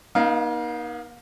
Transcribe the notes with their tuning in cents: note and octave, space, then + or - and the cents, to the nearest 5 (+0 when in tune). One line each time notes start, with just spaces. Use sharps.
A#3 +45 D#4 +0 F5 -5